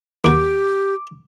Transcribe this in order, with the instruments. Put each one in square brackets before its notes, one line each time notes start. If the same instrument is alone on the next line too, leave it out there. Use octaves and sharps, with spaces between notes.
[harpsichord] D#2 F#4 [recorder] G4 [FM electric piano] D6